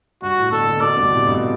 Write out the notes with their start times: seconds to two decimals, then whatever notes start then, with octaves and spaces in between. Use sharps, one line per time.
0.22 G2 F#4
0.38 A2
0.52 B2 D3 A4
0.67 B2 D3
0.81 B2 D3 D5
0.97 G2 B2
1.11 A2 C3
1.26 G2 B2